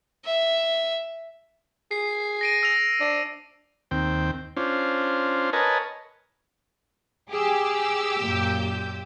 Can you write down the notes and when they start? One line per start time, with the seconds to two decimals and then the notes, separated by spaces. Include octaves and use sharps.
0.25 E5
1.91 G#4 C7
2.41 A#6 D7 D#7
2.63 E6 A#6 F7
3.01 D4
3.91 D#2 C4 G5
4.57 C#4 D4 F4 C5
5.53 A#4 B4 C#5 D#5 G#5 A5
7.30 G4 G#4 D6 E6
8.19 F#2 A#2 G6